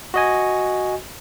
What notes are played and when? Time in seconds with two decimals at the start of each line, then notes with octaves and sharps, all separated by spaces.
0.14 F#4 D#5 G#5